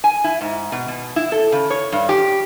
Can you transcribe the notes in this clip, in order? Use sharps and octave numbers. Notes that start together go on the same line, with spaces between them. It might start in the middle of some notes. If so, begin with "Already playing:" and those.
G#5
E4
G#2
B2
B2
E4
A4
C#3
C#5
G2
G4